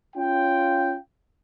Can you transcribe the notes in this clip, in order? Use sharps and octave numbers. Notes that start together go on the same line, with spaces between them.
C#4 F4 G5